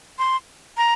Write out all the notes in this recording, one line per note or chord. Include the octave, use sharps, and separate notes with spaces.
C6
A#5